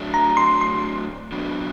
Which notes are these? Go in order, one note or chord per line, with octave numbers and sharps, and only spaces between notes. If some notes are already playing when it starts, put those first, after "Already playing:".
Already playing: A2 F#3 A3 D4
A#5
C6
C6
B2 F#3 B3 D4 F#4